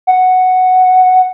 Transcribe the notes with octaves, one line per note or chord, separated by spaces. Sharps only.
F#5